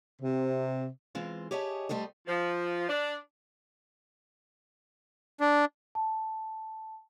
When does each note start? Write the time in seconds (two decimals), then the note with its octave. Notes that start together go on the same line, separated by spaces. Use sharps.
0.21 C3
1.15 E3 G#3 C4 F4
1.51 G4 G#4 C#5 D#5 E5 A5
1.89 D2 G3 A3 C5 D#5
2.27 F3
2.89 D4
5.40 D4
5.95 A5